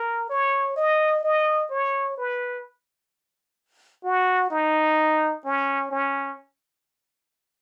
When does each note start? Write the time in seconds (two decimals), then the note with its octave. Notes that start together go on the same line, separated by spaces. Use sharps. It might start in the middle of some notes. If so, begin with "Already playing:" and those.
Already playing: A#4
0.30 C#5
0.76 D#5
1.23 D#5
1.71 C#5
2.17 B4
4.04 F#4
4.51 D#4
5.45 C#4
5.91 C#4